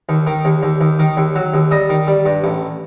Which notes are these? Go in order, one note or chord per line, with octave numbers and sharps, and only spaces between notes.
D#2
D#3
D#2
D#2
D#2
D#3
D#2
F#3
D#2
G3 D#5
D#3
G3
G2
A1